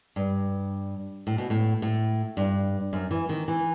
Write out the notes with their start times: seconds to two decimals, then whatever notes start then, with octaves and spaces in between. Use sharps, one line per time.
0.16 G2
1.27 A2
1.38 B2
1.50 A2
1.82 A2
2.37 G2
2.93 F#2
3.11 E3
3.29 D#3
3.48 E3